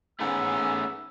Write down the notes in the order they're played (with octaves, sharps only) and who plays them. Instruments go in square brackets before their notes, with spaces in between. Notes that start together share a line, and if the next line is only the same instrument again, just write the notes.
[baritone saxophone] G#2 [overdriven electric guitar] A3 C#4 [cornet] B3 [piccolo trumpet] E6